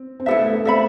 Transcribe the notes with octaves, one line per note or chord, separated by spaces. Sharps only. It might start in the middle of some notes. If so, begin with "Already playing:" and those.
Already playing: C4
C4
B3 E4 A4 E5
A3
A3
C4 A4 E5 B5